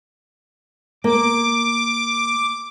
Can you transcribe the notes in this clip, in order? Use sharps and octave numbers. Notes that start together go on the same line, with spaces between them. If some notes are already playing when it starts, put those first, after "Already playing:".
A#3 D6